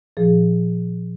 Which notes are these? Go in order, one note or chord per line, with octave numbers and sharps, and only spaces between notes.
A#2 F3 G#4